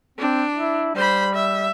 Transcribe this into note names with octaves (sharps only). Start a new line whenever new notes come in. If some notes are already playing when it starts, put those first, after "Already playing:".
C4 D4
E4
G3 C5 B5
E5